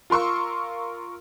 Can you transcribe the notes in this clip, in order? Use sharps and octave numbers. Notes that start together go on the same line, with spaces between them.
F4 A#4 C6 C#6 E6